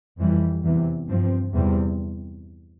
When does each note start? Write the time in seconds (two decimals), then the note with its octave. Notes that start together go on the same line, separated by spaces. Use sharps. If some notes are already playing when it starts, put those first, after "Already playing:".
0.18 F2 E3 G3
0.63 E2 C3 E3
1.08 G2 F3 C4
1.53 E2 C3 G3 C4